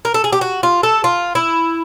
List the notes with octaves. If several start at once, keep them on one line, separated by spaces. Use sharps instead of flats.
A#4
A4
G#4
G4
F#4
F4
A4
F4
E4